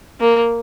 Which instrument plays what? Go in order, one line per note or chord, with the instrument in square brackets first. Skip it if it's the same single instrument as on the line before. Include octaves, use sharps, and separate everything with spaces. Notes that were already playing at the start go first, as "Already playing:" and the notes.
[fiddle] A#3